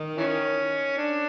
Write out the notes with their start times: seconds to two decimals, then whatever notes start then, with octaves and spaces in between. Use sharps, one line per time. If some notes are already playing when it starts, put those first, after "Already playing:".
Already playing: D#3
0.17 E3 C#4
0.98 D4